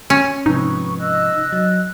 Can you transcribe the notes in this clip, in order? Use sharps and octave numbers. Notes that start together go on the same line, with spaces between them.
C#4
G#2 C3 F3 D#4 B4 C#6
D#5 E6 F#6
F#3